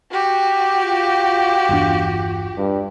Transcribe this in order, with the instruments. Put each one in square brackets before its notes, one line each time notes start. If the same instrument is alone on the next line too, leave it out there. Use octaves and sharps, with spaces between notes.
[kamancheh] F#4 G4
[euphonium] F4
[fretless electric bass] G1 E2 D4
[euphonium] G2